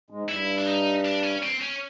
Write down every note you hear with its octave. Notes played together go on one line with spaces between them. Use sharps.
G#2 G#3
G2 G3 E4
D4
D#4
D4
C#4
C4
C#4